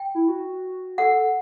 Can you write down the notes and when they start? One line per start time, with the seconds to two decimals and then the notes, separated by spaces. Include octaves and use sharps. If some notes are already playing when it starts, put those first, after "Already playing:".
Already playing: G5
0.15 E4
0.28 F#4
0.98 A4 F#5
1.13 A4